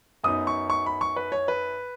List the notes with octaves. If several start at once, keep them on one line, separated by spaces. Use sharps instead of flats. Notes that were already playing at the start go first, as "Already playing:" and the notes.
F#2 F#3 B3 D#4 D#6
C#6
C#6
B5
C#6
B4
C#5
B4